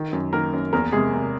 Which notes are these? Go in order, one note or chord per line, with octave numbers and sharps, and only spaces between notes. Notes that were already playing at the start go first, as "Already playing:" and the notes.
Already playing: D#3
F#2
D#3 A#3 A#4
F#2
E2 A#3 A#4
C3 G#3 G#4
C3